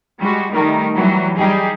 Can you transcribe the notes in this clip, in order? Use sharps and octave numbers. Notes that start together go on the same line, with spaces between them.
G3 G#3 F#4
D#3 G3 A3 D#4 A#4
E3 F#3 G3 F#4
G3 D#4 G4 G#4